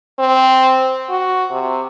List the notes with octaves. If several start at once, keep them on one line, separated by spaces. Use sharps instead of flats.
C4
F#4
C3